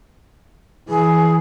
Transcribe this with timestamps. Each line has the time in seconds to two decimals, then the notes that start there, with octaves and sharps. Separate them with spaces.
0.89 E3 G#4